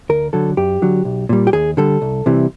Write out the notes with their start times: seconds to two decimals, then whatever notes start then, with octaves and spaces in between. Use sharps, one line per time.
0.09 D2 A#4
0.33 D3 F#3 A4
0.57 F#2 G4
0.82 D3 F#3
1.05 B1
1.29 A#2 G3
1.47 G4
1.53 D#2 G#4
1.77 D3 G3 A4
2.02 C2
2.26 C3 E3 G3